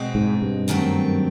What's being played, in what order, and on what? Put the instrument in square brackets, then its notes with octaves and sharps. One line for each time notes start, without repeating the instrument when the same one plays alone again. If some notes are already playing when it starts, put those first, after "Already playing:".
Already playing: [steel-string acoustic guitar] B2 G#3 C4
[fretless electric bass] G#2
G2
[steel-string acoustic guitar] F#2 D#3 F#3 A3 C4